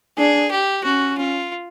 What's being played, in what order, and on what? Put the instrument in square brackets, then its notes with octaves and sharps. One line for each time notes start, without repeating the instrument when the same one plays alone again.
[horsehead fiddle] D4 [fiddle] G#4
[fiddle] G4
[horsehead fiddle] C#4 [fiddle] F#4
[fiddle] F4